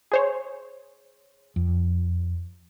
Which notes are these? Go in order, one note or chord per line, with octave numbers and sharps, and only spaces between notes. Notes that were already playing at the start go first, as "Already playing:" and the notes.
G#4 C5 C#5
F2